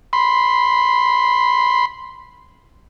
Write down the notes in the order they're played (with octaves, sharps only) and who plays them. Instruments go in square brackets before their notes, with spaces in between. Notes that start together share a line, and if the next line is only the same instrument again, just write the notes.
[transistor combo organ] B5 C6